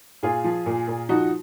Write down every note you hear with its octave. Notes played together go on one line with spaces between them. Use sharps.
A#2 F4 G#4
F3
A#2
A#2
F3 D#4 F#4